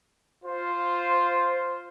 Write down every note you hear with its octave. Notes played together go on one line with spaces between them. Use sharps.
F4 C5